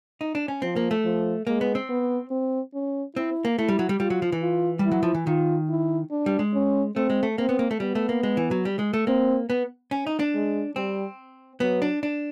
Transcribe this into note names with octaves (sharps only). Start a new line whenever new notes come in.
D#4
D4
C#4
F3 C4
A#3
A3
F3
G#3 A#3
B3
C4
B3
C4
C#4
C4 E4
A#3
A3 E4
G3
F#3
G3
G3 F4
F#3
F3
E3
F4
G3
E4
F#3
F3
E3
D#3 F4
E4
D4
G3
G#3
C#4
A3 C4
G#3
A3
A#3 C4
B3
A#3
A3
G3 B3
A3
A#3
G#3
E3
F#3
G3
G#3
A3
A#3 C4
B3
C#4
D#4
D4
G#3
G3 C4
F#3 B3
D4
D4